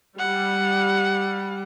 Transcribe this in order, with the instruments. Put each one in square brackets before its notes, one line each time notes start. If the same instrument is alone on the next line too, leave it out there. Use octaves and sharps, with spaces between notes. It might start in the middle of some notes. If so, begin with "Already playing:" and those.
[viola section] G3 [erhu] F#5